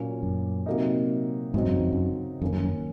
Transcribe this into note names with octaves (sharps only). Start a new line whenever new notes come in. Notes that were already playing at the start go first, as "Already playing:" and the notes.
Already playing: A#2 F#3 A#3 C#4
F#2
C3 F#3 A#3 D#4
G#2 C#3 F#3 C4 D#4
F#2
F2
F#2
F#2 D#3 A#3 C#4
F#2
F#2